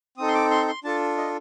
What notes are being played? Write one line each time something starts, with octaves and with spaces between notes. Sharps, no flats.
C4 D#4 A4 D#6
C6
D6
C6
C6
D4 F4 A4 A5
D#5